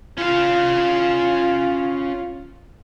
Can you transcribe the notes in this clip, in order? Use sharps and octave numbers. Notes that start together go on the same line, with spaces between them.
C#4 F4 F5